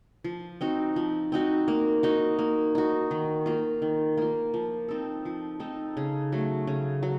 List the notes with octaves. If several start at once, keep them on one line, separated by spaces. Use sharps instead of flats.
F3
C4 D#4 F#4
F3
C4 D#4 F#4
A#3
D#4 F#4
A#3
D#4 F#4
D#3
A#3 F4
D#3
A#3 F4
F3
C4 D#4 A4
F3
C4 D#4 A4
C#3
F#3 A3
C#3
F#3